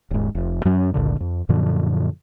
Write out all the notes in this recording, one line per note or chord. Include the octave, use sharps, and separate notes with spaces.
D#1 G#2
F1
F#2 F#3 C#4
G1 C#2 A#2 D3
F2
F#2 A#2 D3 F3